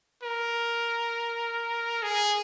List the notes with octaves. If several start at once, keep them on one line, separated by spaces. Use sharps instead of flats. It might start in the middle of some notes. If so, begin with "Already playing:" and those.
A#4
G#4